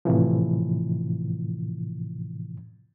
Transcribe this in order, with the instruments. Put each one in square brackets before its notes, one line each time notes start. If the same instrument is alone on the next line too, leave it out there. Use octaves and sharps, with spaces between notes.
[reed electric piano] A2 C3 E3 F3